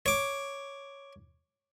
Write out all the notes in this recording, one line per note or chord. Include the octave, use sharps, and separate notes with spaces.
C#5 D6